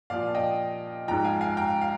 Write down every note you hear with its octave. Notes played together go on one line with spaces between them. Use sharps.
A#2 F3 D5 F5
D#5 G5
G#2 F3 G5 A#5
F5 G#5
F5 G#5
G5 A#5
F5